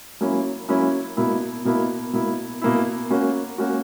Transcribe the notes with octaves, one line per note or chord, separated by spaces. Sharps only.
F#3 A#3 C#4 E4
F#3 A#3 C#4 E4
B2 A#3 E4
B2 A#3 E4
B2 A#3 E4
B2 A#3 E4
A#3 C#4 F#4
A#3 C#4 F#4